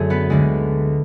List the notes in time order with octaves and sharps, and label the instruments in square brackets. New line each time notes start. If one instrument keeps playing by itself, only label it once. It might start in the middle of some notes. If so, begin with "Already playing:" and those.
Already playing: [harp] F#2 D3 A3 G#4
B3 B4
D2 D3 G#3